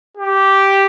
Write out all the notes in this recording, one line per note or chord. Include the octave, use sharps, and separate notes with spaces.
G4